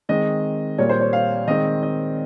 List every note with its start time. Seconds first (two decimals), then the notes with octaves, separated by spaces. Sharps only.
0.09 D#3 G#3 C4 D#5
0.78 A#2 G3 A#3 C#5
0.89 C5
1.01 C#5
1.13 F5
1.47 D#3 G#3 C4 D#5
1.83 D#5